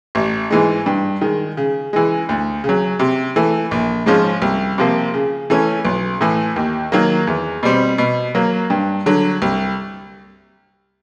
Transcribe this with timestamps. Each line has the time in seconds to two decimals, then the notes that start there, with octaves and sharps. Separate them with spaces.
0.15 A1
0.51 G#2 E3 G#3
0.86 G2
1.21 D#3 G#3
1.57 C#3
1.93 E3 G#3
2.29 D2
2.64 C#3 F#3
2.99 C3
3.36 E3 A3
3.71 A#1
4.06 G#2 F3 G#3 C#4
4.42 C2
4.78 C3 F3 A#3
5.14 C#3
5.50 E3 A3 C#4
5.85 B1
6.21 A2 E3
6.56 D#2
6.92 D#3 F#3 A#3
7.27 E2
7.63 B2 G3 C4
7.98 B2
8.35 F#3 A#3
8.70 G2
9.06 D3 F#3
9.42 C2